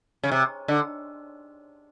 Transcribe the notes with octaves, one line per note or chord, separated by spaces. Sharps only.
C#3
C3
D3